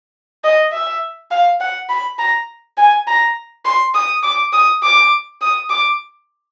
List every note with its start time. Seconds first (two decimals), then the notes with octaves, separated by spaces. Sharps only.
0.44 D#5
0.72 E5
1.31 F5
1.60 F#5
1.89 B5
2.19 A#5
2.77 G#5
3.07 A#5
3.65 C6
3.94 D#6
4.23 D6
4.53 D#6
4.83 D6
5.41 D#6
5.70 D6